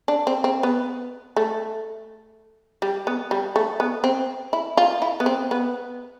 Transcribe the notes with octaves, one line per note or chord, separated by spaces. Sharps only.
D4
C4
C4
B3
A3
G3
B3
G3
A3
B3
C4
E4
F4
E4
B3
C4
B3